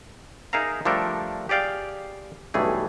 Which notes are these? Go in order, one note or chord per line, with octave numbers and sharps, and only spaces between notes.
D#4 G#4 A#4 E5 F5 A#5
F3 G3 A3 D4 A4 A#4
G4 G#4 D5 F5 G5
B1 G2 E3 A3 G#4